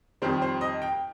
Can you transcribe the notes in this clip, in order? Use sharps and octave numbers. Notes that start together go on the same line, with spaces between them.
F2 D#3 G3 C5
C5
D#5
G5